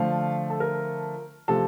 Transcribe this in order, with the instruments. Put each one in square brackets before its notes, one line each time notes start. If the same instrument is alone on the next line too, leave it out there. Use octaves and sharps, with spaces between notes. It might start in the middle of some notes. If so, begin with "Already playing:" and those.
Already playing: [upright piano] D3 F3 A3 F5
A4
A#4
C3 F3 A3 A4